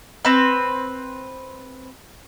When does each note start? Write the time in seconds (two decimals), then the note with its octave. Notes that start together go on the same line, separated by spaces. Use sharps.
0.25 C4 B4